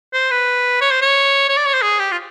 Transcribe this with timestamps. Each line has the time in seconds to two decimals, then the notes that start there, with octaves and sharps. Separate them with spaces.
0.14 C5
0.31 B4
0.81 C#5
0.91 C5
1.02 C#5
1.49 C#5
1.57 D5
1.66 C#5
1.74 C5
1.82 G#4
1.99 G4
2.12 F4